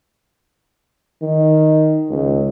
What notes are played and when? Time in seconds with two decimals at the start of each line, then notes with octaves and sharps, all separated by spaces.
1.22 D#3
2.10 C#2